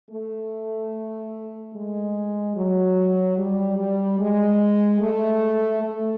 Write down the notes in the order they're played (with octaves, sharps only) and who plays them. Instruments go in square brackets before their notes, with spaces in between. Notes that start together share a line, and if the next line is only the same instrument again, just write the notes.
[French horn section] A3
G#3
F#3
G3
G3
G#3
A3
A3